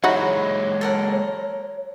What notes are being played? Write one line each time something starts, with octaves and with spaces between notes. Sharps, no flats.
F#3 G#3 D#4 E4 F#4 C#5 B5
A4 A#4 F#5